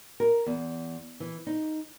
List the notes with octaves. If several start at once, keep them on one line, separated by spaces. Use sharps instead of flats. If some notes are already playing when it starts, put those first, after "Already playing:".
A#4
E2
E3
D#4